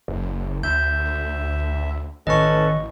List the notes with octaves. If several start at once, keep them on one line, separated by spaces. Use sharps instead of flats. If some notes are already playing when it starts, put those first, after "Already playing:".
F#1
D2 E5 G6
A1 D#3 C#4 A4 B4 D#5 C#6